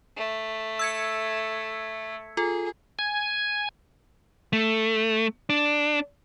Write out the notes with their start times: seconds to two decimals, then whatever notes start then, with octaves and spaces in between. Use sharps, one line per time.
0.17 A3
0.79 E6 G#6 C#7
2.37 F4 G#4 A4
2.99 G#5
4.53 A3
5.50 D4